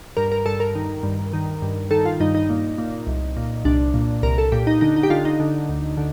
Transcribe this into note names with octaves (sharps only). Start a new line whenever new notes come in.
G2 A#4
A#4
G2 A4
A#4
D#3
G2
D#3
G2
D#3 A4
F4
G2 D#4
D#4
A#2
A#2
C2
A#2
C2 D4
A#2
C2 A#4
A4
A#2 G4
D#4
D3 D#4
D#4
G4
D3 F4
D#4
D3
D2
D3